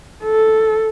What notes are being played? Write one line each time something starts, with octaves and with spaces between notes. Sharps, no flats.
A4